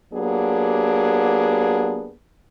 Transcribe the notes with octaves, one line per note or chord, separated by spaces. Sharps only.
F#3 A#3 B3 D4 G4 G#4